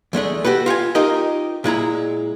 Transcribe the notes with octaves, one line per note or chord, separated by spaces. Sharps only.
E2 G#3 A3 D4
F#4 G4 A4 B4
F4 G4 F#5 G#5
D#4 F4 G4 A#4 D#5
A#2 G#3 E4 A#5